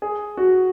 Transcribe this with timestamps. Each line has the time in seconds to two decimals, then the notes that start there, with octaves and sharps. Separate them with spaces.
0.02 G#4
0.37 F#4